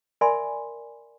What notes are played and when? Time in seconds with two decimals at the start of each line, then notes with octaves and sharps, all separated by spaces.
0.21 A#4 D5 E5 G#5 B5 C6